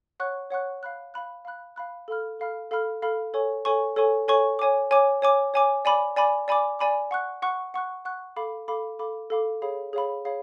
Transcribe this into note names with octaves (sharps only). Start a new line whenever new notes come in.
C#5 F#5 C#6 F#6
C#5 F#5 C#6 F#6
F5 B5 F#6
F5 B5 F#6
F5 B5 F#6
F5 B5 F#6
A4 F5 B5 F6
A4 F5 B5 F6
A4 F5 B5 F6
A4 F5 B5 F6
A4 C#5 G#5 C#6
A4 C#5 G#5 C#6
A4 C#5 G#5 C#6
A4 C#5 G#5 C#6
C#5 G#5 D6
C#5 G#5 D6
C#5 G#5 D6
C#5 G#5 D6
D5 G#5 B5 D6
D5 G#5 B5 D6
D5 G#5 B5 D6
D5 G#5 B5 D6
F#5 C#6 F#6
F#5 C#6 F#6
F#5 C#6 F#6
F#5 C#6 F#6
A4 F5 B5 D6
A4 F5 B5 D6
A4 F5 B5 D6
A4 F5 B5 D6
G#4 C#5 F5 B5
G#4 C#5 F5 B5
G#4 C#5 F5 B5